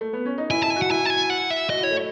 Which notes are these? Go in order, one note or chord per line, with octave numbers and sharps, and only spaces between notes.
A3
B3
C#4
D#4
E4 G#5
E4 A5
G#5
F#4
F#5
E4 G#5
A5
G#5
F#5
E5
F#4 D#5
E4 C#5
A3